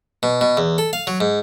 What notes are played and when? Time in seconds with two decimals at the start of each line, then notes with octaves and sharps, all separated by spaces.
0.23 B2
0.41 B2
0.57 E2
0.78 A4
0.93 F5
1.07 F#3
1.21 G#2